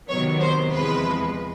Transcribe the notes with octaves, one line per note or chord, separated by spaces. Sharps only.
C3 D#3 F#3 B3 C#5
C5
E2 C3 F3 G#3 B4